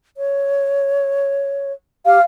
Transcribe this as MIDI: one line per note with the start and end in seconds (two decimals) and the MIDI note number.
0.17 1.73 73
2.06 2.18 67
2.06 2.21 77